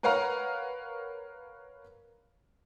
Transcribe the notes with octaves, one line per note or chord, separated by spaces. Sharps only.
A#4 B4 C#5 F5 F#5 A#5